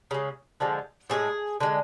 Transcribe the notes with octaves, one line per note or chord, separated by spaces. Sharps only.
C#3 G#3
D3 F3 G#3
A2 F3 G#3 G#4
D3 G#3